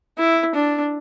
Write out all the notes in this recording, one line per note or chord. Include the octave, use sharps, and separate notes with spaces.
E4
D4